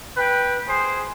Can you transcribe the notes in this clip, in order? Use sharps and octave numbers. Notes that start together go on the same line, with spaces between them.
B4 G5
G#4 C5